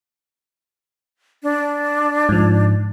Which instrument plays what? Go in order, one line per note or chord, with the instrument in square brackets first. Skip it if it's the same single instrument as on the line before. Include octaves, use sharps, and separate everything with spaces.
[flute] D4
[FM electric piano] G#2 F3